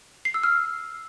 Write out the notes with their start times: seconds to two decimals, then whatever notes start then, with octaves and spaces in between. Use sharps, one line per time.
0.25 C7
0.34 E6
0.43 F6